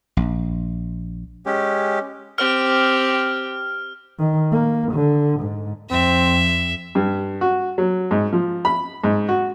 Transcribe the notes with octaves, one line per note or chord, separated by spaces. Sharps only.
A#1
G#3 C#4 G4
C4 G4 F6
D#3
A#3
D3
G#2
F2 C4 E5
G2
F#4
F#3
G#2
F3
B5
G#2
F#4